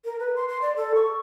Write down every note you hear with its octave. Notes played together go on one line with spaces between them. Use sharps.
A#4
B4
C6
C6
D5
A4
C#6